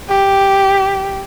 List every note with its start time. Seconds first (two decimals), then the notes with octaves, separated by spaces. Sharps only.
0.09 G4